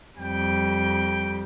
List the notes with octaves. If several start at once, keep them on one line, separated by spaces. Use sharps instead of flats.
F2 G3 G5